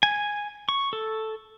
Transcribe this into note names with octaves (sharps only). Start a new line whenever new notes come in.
G#5
C#6
A4